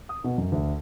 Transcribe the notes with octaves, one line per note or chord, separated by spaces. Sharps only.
D#6
B2
F#2
D2